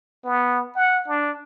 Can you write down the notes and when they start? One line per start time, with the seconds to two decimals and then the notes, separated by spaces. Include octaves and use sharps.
0.24 B3
0.76 F#5
1.08 D4